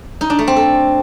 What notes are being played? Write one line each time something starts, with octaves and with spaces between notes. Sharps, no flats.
D#4
D4
A3
C4
A4